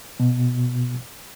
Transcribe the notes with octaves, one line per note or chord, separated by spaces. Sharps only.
B2